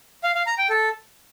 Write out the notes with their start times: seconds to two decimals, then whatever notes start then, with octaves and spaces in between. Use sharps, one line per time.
0.23 F5
0.35 F5
0.46 A#5
0.58 G5
0.70 A4